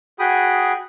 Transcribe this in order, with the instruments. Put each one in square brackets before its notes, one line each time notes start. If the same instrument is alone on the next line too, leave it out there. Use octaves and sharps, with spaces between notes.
[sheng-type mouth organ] F#4 G#4 G5 B5 D#6